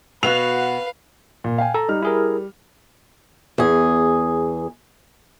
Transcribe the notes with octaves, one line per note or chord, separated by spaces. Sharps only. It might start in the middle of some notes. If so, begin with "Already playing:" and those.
B2 B3 F#4 B4 F5 F7
A#2
F5 G5 G#5
A4 A#5
G3 D#4 F6
E4 G#4 A#4
E2 G#4